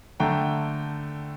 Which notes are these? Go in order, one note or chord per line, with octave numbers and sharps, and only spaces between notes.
D3 A3 G5 A#5